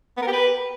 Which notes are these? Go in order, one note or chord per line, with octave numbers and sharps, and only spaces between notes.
B3
A#4
G4
B4